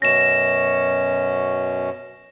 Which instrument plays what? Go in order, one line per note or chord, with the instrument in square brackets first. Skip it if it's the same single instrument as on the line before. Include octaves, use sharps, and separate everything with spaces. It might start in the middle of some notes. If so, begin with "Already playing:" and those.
[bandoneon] F#2 B2 C#4 [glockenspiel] A#6 E7